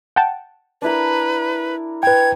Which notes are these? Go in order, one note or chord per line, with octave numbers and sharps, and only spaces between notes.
F#5 G5 A5
D4 E4 A#4 B4
B4 G5 G#6